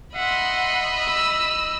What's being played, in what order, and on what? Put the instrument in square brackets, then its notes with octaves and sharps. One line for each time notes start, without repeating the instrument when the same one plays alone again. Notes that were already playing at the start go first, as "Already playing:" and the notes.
[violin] D#5 B5 [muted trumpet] E5 [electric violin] F#5 C6
[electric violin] E6